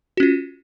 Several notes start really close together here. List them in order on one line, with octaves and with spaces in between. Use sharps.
F#4 C#4 F4